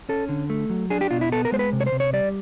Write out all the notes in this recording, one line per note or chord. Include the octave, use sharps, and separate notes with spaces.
C#4 A4
D3
A3
F#3
D4 G#4
G4
B2 F4
E4
B3 A4
A#4
G#3 C5
B4
C3
C#5
C5
C3
C#5
G3 D5